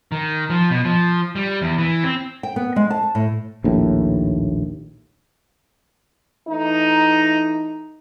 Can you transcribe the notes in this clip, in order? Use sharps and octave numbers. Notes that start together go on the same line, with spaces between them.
D#3
F3
B2
F3
G3
E2
E3
C4
G5
B3
G#3
A5
A2
A#1 D#2 A2
E3 A3 D#4